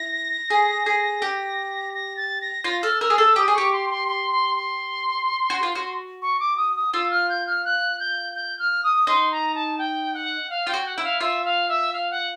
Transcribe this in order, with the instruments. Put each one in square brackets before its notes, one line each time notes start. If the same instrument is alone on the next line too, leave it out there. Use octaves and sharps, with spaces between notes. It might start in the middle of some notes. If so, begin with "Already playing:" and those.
Already playing: [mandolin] E4 [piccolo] A#6
[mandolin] G#4
G#4
G4
[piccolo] A#6
A6
A#6
[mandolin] F4 [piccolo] A#6
[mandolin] A4 [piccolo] F6
[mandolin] A#4 [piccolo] E6
[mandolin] G#4
[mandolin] A4 [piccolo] E6
[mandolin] G4 [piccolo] D#6
[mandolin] G#4
[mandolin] G4 [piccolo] C#6
[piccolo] C6
C6
C6
C6
C6
[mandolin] F#4
F4
F#4
[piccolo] C#6
D6
D#6
D#6
[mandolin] F4 [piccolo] E6
[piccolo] F6
G6
F6
F#6
G6
G6
F6
D#6
[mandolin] D#4 [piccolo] C6
[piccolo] A#5
A5
G5
F#5
F5
[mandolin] F4 [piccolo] G5
[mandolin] F#4
[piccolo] F#5
[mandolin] E4 [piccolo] E5
[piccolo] F5
[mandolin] F4 [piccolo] E5
[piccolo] F5
E5
F5
F#5